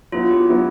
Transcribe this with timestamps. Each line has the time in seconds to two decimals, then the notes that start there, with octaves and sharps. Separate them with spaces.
0.12 F#3 B3 E4 F4
0.31 G4
0.49 F#3 B3 E4